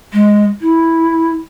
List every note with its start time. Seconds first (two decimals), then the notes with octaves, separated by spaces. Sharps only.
0.13 G#3
0.61 E4